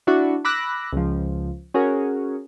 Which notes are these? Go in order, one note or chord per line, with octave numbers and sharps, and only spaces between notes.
D4 E4 F#4
B5 D6 E6 F#6 A#6
C#2 F3
C#4 F#4 G#4 A#4